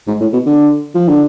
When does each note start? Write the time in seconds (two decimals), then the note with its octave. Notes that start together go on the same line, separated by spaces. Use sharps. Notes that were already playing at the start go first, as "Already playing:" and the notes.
0.08 G#2
0.21 A2
0.33 B2
0.46 D3
0.95 F3
1.08 D3